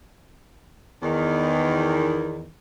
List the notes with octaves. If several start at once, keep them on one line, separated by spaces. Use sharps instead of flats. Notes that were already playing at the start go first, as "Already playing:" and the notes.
E2 D#3